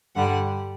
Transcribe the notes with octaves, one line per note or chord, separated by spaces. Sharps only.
G2 D3 G3 F#5